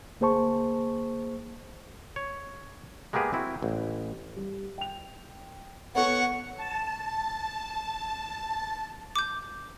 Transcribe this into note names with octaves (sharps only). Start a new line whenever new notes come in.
D2 A#3 G#4 C5 A5 C#6
C#5
G#3 A#3 B3 G4 G#4
C4 E4 F#4
A1
G3
G5 F7
B3 A4 C#5 F#5 C#6
A5
A5
D6 G6